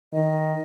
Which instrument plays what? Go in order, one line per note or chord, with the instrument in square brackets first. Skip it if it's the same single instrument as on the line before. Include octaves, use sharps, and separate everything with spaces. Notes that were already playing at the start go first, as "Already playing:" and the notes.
[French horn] D#3 [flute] D#5